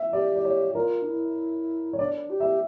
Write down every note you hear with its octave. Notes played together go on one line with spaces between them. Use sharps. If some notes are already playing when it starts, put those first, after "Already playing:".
Already playing: E5
G4 D5
D5
C#5
F4 A#4
D4
E4
C#5
D4 D5
G4
E5